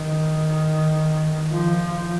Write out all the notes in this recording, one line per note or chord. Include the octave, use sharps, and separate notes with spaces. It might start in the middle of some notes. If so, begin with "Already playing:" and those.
Already playing: D#3
F3